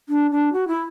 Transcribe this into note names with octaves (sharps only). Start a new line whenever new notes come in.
D4
D4
F#4
E4